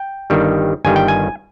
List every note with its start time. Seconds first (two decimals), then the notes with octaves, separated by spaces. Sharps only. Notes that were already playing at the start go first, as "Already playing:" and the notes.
Already playing: G5
0.30 G1 G2 D#3 G3
0.85 G1 G2 D#3 G3 G#5
0.96 G5
1.08 G#5